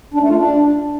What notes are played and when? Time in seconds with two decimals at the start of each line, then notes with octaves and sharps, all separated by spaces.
0.14 D4
0.22 A3
0.29 F4
0.37 D4